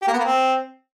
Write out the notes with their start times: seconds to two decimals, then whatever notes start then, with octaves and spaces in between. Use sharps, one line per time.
0.02 G4
0.08 A#3
0.13 B3
0.19 A#3
0.25 C4